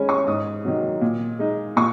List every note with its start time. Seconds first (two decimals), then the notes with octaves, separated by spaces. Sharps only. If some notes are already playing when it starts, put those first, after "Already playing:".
Already playing: D#3 G#3 C#4 G#5 B5
0.09 C#6
0.27 G#2 D#6
0.65 D#3 F#3
1.01 A#2
1.39 G#3 D#4
1.76 A#2 C#6